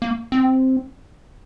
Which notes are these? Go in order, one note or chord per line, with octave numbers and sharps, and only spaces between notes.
A#3
C4